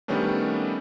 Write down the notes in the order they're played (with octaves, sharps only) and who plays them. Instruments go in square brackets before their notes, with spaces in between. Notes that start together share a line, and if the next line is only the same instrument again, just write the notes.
[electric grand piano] D#3 G3 A3 B3 C#4 D4